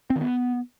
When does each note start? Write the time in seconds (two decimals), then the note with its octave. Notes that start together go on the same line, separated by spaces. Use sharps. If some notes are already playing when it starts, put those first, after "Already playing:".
0.10 C4
0.16 D#3
0.21 B3